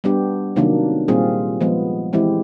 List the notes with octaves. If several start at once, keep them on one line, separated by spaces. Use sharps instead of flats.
G3 B3 D4 G4
C3 D#3 F#3 A#3 D4
A#2 G3 C4 F4 G#4
F3 G#3 B3
E3 G#3 C4 E4 G4